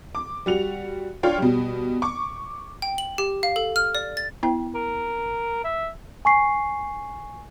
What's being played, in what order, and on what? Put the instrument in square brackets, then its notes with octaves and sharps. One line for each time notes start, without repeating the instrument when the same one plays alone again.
[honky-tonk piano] D6
G3 F#4 F7
D4 F4 C#5 G5
B2 G3
C#6 D6
[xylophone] G5
F#7
G4
F5
A4
F6
D5
A6
[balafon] B3 E4 G5
[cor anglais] A#4
E5
[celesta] G#5 C#6 C7